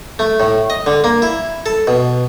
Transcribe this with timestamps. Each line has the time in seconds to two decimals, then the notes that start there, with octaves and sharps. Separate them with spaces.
0.19 A3
0.40 A2
0.70 D#5
0.87 D3
1.04 A#3
1.22 E4
1.66 A4
1.87 B2